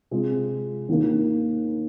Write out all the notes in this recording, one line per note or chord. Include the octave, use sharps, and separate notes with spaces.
C3 G#3 F4 G#4
D#2 D#3 A#3